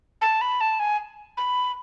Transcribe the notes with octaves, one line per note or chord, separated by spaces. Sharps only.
A5
B5
A5
G#5
B5